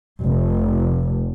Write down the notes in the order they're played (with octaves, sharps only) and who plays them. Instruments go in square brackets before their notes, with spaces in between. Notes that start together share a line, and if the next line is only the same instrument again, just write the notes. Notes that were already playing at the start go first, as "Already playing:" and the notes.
[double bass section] F1